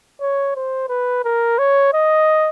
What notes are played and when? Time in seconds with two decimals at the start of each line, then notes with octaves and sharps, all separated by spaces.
0.21 C#5
0.56 C5
0.89 B4
1.24 A#4
1.59 C#5
1.93 D#5